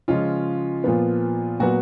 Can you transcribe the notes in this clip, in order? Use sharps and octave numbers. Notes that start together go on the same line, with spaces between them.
C#3 F3 G#3 C#4 F4
A#2 F3 B3
A#2 F#3 B3 F#4